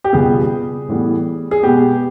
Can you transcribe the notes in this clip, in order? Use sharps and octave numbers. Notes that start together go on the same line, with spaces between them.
G4
C#2 B2 G3 B3 G#4
A2 E3 G3 B3
G#4
B2 G#3 B3 G4